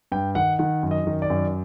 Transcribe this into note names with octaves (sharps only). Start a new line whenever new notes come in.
G2 G5
D#3 F#5
D#3 F#5
F#2
D#5
D#3
D5
F#2